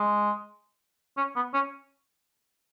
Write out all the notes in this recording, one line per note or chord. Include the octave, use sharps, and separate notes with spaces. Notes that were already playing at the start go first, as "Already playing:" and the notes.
Already playing: G#3
C#4
B3
C#4